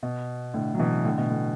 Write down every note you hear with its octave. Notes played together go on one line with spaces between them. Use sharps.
B2
A2 D3
F#3
B2 E3
A2 D3
B2
A2